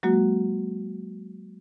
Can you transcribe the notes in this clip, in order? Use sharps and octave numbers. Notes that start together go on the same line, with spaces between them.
F#3 G#3 A#3 F#4